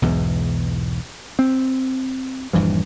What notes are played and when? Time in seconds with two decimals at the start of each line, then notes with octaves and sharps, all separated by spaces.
0.02 B1 E2 G#2 B2
1.39 C4
2.53 D#1 G2 E3 F3